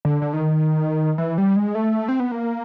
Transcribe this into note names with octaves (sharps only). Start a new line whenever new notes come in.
D3
D3
D#3
E3
G3
G#3
A3
C4
B3
A#3